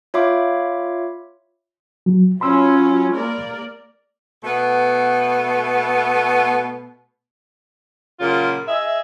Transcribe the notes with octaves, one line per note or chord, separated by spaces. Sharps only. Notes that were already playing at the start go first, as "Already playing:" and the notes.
F4 C#5 E5 F5 B5 D6
F#3
F#3 C#4 F4 B5 C6 E6
A#3 A#4 D5
B2 A3 B3
A#2 C#3 F#3 F4 A#4
G#4 D#5 E5